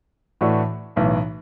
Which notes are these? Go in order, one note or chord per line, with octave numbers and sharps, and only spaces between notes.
A2 E3 A3 D4 F#4
B1 A2 E3